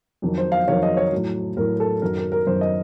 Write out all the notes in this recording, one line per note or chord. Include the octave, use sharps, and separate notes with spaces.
F2 D#3 F#3
C5
F5
F2 D#3 F#3 C#5
D#5
C#5
A2 F#3
A2 F#3 A#4
A4
F#2 D#3 F#3 A#4
A#4
A#4
F#2 D#3 F#3 C5
D#5